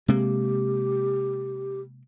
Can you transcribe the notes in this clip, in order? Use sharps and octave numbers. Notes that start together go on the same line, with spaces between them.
C3 G#3 A#3 G4